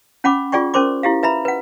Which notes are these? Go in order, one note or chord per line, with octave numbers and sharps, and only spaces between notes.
C#4 F#5 B5 D6
F4 G#4 D5 G5 C#6
C#4 A#4 C5 C6 D6
E4 G4 F5
B4 E5 A#5 B5
B4 F#5